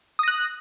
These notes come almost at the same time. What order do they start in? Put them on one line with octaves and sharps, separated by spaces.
D#6 A#6 F#6